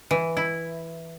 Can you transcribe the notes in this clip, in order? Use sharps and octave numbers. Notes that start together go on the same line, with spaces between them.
E3
E4